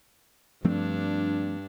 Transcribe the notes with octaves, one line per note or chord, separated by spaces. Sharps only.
G2 F3 A3 C4 D4